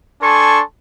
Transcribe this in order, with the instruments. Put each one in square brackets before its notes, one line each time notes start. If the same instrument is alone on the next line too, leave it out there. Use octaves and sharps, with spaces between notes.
[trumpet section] D4 A4 G#5 A5 C6 C#6